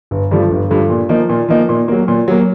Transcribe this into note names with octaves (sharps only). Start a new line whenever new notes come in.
G1
G2 D3 F3 A3
G1
G2 D3 F3 A3
A#2
F3 A#3 D#4
A#2
F3 A#3 D#4
A#2
F#3 A#3
A#2
F#3 A#3